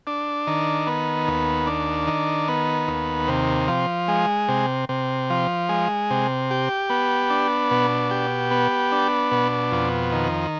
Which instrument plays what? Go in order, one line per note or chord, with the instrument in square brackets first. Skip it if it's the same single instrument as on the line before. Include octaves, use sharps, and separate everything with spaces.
[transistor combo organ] D4
D#3
B3
D#2
D4
D#3
B3
D#2
C3
F3
G#3
C3
C3
F3
G#3
C3
G4
B3
D4
B2
G4
B3
D4
B2
F2
D#3